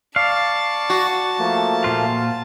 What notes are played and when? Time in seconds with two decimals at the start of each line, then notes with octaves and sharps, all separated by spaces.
0.16 D5 F5 A5 C#6
0.90 F#4
1.39 F3 A3 A#3
1.84 A#2 F4